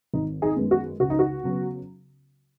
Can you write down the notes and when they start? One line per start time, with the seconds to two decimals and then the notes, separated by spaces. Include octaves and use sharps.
0.14 G#1 D#4
0.42 D#4 G#4
0.56 F#2 D#3 G#3 B3
0.71 F#4
1.00 C#2 F#4
1.10 D#4
1.19 F#4
1.43 C#3 F#3 B3